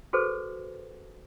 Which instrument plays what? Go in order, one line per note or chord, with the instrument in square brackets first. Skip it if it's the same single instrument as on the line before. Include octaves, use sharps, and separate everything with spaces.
[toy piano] F#4 G#4 A4 B4 C5